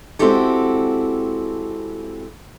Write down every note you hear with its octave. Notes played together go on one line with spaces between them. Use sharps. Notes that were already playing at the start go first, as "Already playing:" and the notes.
G#3 C4 E4 F#4 G4 A4